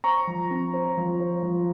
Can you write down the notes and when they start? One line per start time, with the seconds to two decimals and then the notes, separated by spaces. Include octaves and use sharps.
0.04 C5 A#5 C#6
0.27 F3
0.50 C4
0.74 C5
0.97 F3
1.20 C5
1.42 F3